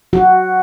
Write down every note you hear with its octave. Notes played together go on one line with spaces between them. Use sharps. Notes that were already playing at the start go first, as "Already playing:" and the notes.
F#3 F#4